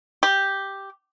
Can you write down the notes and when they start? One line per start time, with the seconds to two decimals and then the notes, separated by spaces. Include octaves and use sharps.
0.23 G4